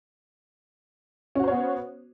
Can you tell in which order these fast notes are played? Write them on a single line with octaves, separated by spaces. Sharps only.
C#4 F#4 C5 C#5 B3